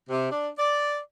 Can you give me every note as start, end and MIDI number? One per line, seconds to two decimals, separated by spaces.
0.08 0.31 48
0.31 0.47 62
0.57 0.97 74